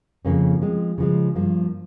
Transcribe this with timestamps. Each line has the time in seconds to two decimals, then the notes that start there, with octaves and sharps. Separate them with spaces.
0.25 F2 C#3 F3 A#3 C#4
0.62 F3 G#3 C4
0.98 C#3 F3 G#3
1.35 G2 F3 A#3